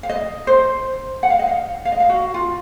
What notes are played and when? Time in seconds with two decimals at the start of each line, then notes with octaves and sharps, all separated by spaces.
0.03 F5
0.09 D#5
0.47 C5
1.23 F#5
1.30 F5
1.39 D#5
1.47 F5
1.85 F5
1.92 D#5
2.00 F5
2.09 F#4
2.34 F4